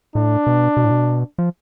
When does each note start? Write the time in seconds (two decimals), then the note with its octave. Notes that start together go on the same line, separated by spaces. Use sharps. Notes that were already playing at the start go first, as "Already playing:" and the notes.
0.15 A2 D4
0.47 B2
0.77 B2
0.85 A2
0.91 B2
1.38 F3